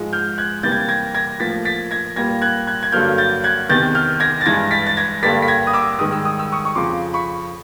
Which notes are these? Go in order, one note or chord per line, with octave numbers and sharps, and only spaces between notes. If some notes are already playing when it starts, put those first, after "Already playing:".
Already playing: G#2 F3 G#3
F6 G6
F#6 G#6
C3 E3 G3 A#3 G6 A6
G#6
A6
G#6 A#6
G#6 A#6
A2 F3 A#3 A6 B6
A6 B6
G#6 A#6
A#2 G3 A#3 G#6 A#6
F#6 G#6
F#6 G#6
G#6
G2 D3 F#3 A#3 F6 G6
G6 A6
F#6 G#6
E2 C3 D#3 G6 A6
F6 G6
G#6 A#6
A6
G2 E3 G#3 G#6 A#6
A6 B6
A6
G#6 A#6
G2 D3 G3 A#3 A6 B6
B6
G#6 A#6
D#6
D6 E6
G#2 D#3 G3 D#6
E6
D#6
E6
C#6 D#6
C#6
F2 C#3 F3 C6 D6
B5 C#6